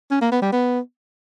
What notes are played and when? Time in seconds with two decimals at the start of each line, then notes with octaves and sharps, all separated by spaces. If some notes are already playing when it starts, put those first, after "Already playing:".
0.11 C#4
0.21 A#3
0.32 B3
0.42 G3
0.52 B3